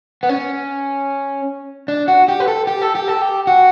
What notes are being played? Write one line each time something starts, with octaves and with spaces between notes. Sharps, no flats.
B3
C#4
D4
F#4
G4
B4
A4
G4
A4
G4
A4
G4
F#4